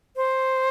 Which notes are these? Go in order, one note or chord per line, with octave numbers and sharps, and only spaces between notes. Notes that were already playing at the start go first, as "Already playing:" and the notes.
C5